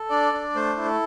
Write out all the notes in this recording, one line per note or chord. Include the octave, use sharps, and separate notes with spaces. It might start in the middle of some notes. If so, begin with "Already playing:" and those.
Already playing: A4
D4 D5
D4
A3 C5
E4
A4